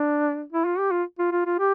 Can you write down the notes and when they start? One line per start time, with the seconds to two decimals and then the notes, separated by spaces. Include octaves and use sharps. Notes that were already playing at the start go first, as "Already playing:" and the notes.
Already playing: D4
0.52 E4
0.65 F4
0.78 G4
0.91 F4
1.19 F4
1.32 F4
1.46 F4
1.59 G4